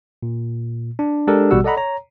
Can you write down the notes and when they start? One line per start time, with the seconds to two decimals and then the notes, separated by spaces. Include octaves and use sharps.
0.23 A#2
0.99 D4
1.27 G#3 D4 G4 A4 A#4
1.51 A1 B2 G3 F#4 F#5 E6
1.64 A4 D5 D#5 F#5 A#5 B5
1.77 C#5 A#5